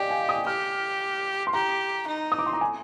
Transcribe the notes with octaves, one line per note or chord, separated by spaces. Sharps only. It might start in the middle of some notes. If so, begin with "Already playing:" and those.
Already playing: G4 D5 D#5 F5 G5 G#5
G#5
D#6
G4 F6
C6
G4 A#5
D#4
D#6
D6
C6
A#5
G#5